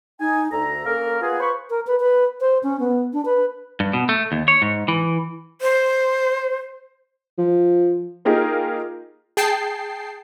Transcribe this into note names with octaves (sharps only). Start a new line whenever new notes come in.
D#4 G#5
D2 A4 A#5
A#3 C#4 A#4
B3 F4 G#4 B4
C5 B5 C#6
A#4
B4
B4
C5
C#4
B3
D4
B4
G2
B2
A3
D#2
C#5
G#2
E3
C5
F3
A#3 D#4 F4 G4 G#4 A#4
G#4 G5 A5 C7